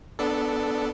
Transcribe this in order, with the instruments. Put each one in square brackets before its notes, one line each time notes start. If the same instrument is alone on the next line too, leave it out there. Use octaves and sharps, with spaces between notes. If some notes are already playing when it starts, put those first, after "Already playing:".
[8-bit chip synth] B3 D4 A4